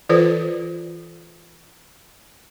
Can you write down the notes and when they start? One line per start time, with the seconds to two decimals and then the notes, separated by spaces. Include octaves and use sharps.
0.09 E3 F4 A4 B4 C5 D5